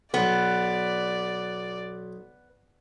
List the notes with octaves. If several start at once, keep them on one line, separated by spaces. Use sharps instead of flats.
B1 B3 D5